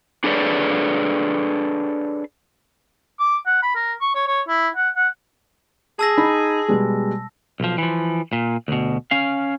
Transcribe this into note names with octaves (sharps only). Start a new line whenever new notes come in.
D4 G#4 A4 B4 C#5 D5
D6
F#5
B5
A#4
C#6
C#5
C#5
E4
F#5
F#5
G#4 A5 E6 A#6
D#4 B5
B2 G3 G#3
B1 F3
E3 F3
A#2
D2 B2
C#4 F5